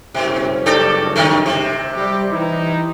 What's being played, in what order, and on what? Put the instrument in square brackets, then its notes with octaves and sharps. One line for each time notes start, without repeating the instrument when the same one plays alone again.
[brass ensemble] F#1 G2 C#4 [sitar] B2
[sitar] D4 G4 A4
D3 D#3 A3
C3
[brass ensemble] G3 G4
E3 D#4 E4